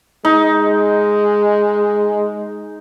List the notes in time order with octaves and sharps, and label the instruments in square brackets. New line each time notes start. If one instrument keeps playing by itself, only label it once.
[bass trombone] G#3 [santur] D#4